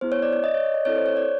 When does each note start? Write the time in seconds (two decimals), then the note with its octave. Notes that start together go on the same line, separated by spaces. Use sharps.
0.01 B3 E4 G#4 C5
0.12 C#5
0.22 D5
0.33 D5
0.44 D#5
0.54 C#5
0.65 D5
0.74 D#5
0.85 C4 E4 A4 C#5
0.96 C5
1.06 C#5
1.17 D5